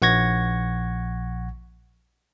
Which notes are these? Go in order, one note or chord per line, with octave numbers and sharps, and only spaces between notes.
A#1 F#5 C#6 G#6 A#6